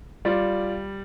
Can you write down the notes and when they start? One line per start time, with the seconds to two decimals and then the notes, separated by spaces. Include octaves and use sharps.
0.25 G3 F4 D5